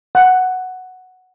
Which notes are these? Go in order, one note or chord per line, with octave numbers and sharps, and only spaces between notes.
F#5